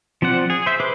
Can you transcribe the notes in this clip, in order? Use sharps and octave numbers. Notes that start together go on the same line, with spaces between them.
F3 C4 D5 F#5
G#4
C5 E5
G#4 B4 C5 D6 F#6